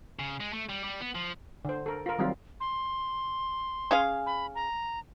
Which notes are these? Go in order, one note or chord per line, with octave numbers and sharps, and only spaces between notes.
C#3
G#3
A3
G3
G3
B3
F3
D3 C5
A4 A#4
F4 A#4
D#3 F#3 G3 C4 F4
C6
C#4 G#4 F5
B5
A#5